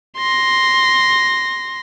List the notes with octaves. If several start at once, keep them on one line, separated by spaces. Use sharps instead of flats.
C6 A#6